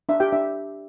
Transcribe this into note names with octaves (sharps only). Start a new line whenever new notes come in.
D4 E5
G4 G5
D4 E5